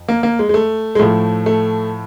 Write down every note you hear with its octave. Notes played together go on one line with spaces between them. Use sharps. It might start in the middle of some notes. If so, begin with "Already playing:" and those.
Already playing: F2
A#3
A#3
G#3
G#3
A3
G#3
A2 F3 A3
A3